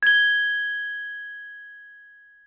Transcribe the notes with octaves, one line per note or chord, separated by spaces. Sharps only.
G#6 G7